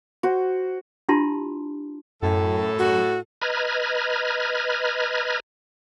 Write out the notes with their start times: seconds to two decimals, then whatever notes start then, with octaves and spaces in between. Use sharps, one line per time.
0.23 F#4 C5
1.09 D4 E4 F4 G4 A5 C6
2.23 F#2 A2 A4
2.79 F#4
3.42 B4 D#5 A#5 B5 F6 G#6